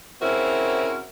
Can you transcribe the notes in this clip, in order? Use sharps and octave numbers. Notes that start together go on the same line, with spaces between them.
C#3 C4 E4 F#4 A#4